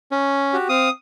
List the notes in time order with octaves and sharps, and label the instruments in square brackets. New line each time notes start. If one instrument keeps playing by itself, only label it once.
[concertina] C#4
[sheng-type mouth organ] F#4 G4
[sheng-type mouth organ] C4 F5 [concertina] D#6